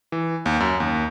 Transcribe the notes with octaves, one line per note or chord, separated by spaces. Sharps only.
E3
D#2
F#2
D#2